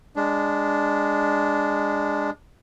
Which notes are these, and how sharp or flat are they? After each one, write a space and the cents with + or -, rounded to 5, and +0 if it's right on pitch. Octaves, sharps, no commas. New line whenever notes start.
G#3 -20 D4 -10